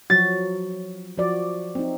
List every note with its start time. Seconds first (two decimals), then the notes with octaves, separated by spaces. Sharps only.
0.10 F3 F#3 F#4 A6
1.18 F3 F#4 D5
1.75 C4 D#4